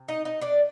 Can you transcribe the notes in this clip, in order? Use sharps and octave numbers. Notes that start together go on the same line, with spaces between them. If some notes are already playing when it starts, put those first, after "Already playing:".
Already playing: C3
D#4 D#5
D#4 D#5
D4 D5